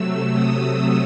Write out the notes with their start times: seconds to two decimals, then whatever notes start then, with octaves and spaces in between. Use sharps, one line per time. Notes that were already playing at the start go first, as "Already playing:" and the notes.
Already playing: C3 F#3 A3 E6
0.33 D#6